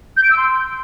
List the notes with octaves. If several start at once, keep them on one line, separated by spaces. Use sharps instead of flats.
G6
D7
E6
C6